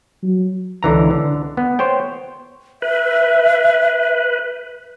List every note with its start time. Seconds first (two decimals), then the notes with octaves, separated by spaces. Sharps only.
0.23 F#3
0.83 C#2 D3 E3 A#5
1.11 D3
1.57 B3
1.79 C5 C#5 G5
2.82 B4 E5